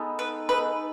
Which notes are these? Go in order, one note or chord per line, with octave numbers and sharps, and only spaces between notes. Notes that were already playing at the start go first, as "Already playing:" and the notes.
Already playing: G#3 B3 D#4 A4
B4
G#3 B3 D#4 A4 B4